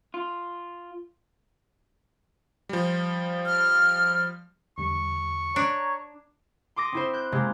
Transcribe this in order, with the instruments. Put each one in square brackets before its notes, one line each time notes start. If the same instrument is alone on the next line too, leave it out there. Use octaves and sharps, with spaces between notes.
[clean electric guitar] F4
[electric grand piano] F3 G3
[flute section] F6
[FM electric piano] E2 D3 G3 [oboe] C#6
[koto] D4 [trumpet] C#5 [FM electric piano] A#5
[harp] C6 D6 D#6 A#6
C4 E4 C5
F#6 G6
C3 G#3 A#3